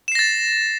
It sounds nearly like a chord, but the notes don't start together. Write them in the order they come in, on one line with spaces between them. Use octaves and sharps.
E7 C7 A#6 A6